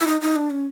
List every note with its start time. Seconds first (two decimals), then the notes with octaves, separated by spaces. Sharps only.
0.01 E4
0.07 D#4
0.21 D#4
0.36 D4
0.50 C#4